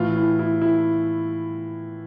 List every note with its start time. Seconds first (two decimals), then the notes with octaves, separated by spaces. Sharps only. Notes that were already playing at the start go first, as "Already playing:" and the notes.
Already playing: A2 E3 F4
0.16 E4
0.39 E4
0.61 E4